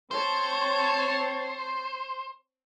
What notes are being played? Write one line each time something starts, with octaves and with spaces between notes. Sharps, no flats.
C4 C5 C#5 A5